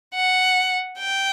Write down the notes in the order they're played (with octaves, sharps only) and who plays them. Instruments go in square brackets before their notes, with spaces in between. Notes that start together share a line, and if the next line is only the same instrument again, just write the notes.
[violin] F#5
G5